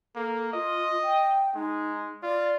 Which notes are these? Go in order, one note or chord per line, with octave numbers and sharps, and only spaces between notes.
A#3 A4
F4 D#5
G5
G#3 D#4
F4 D5